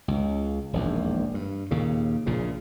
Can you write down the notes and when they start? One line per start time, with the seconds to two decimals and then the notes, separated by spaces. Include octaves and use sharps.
0.08 C#2
0.73 E1 A#1 D#2
1.34 G2
1.71 D#2 A#2 C#3
2.26 A#1 A#2 C#3